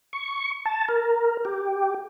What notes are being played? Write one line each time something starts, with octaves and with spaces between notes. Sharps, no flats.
C#6
A5
A#4
G4